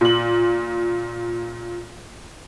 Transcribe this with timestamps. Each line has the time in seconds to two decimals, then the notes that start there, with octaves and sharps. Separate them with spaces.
0.01 A#2 F#7